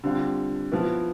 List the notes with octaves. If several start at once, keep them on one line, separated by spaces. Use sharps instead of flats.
D3 G3 C4 F4
F3 B3 E4